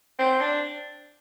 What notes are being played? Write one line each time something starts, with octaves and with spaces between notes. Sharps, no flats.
C4
D4